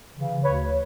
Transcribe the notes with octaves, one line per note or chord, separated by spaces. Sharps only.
C#3 E3
D2 B4 C#5